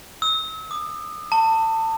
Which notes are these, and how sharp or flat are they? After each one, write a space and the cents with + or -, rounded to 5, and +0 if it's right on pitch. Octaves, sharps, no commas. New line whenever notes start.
E6 -40
D#6 -45
A5 +30